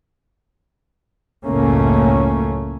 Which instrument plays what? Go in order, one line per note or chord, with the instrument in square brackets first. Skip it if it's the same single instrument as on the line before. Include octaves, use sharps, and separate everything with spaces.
[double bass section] F#1 C#2 A2 A3 A#3 C#4